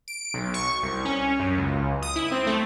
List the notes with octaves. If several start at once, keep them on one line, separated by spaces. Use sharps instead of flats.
D7
B1
C#6
C2
C#4
F#2
C#2
D#6
E4
C4
A3